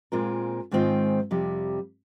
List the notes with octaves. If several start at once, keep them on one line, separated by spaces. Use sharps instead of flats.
A#2 G#3 C4 F4 A#4
G#2 D#3 G#3 C4 F4
F2 C3 G3